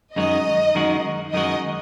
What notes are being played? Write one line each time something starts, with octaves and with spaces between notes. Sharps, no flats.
F#2 D#3 G#3 D#4 F#4 D#5
F#2 D#3 G#3 D#4 F#4
F#2 D#3 G#3 D#4 F#4 D#5